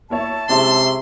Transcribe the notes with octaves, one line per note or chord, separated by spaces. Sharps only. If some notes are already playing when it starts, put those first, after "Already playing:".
A#3 E4 C#5 A5
C3 G#3 C#4 E4 C6